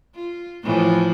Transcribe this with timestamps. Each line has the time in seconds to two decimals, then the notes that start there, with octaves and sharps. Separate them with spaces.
0.15 F4
0.63 A2 E3 F3